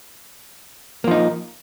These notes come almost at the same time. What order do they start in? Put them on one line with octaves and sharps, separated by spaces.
A#3 F3 D#4